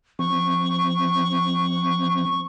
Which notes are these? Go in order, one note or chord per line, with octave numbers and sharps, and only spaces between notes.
F3 C4 C#6